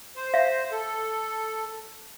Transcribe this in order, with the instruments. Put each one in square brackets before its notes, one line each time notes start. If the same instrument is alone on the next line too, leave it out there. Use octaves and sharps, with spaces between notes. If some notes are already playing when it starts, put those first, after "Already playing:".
[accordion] C5
[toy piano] E5 F5
[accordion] A4